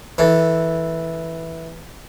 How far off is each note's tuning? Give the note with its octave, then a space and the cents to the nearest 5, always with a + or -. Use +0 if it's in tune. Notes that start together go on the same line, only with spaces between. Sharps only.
E3 -10 A4 +0